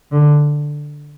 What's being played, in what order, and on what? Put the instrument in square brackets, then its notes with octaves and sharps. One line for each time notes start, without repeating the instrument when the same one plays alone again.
[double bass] D3